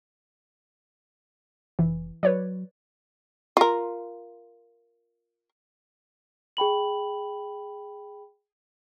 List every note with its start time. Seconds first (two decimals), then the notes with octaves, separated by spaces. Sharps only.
1.79 F1 E3
2.23 F#3 B4 C#5 D5
3.57 F4 A#4
6.57 G#4 G5 B5 F#7